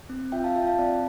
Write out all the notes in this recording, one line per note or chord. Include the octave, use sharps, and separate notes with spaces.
C4
F4 E5 G5
F5 A5
F4 E5 G5
F5 A5
C4 D5 F5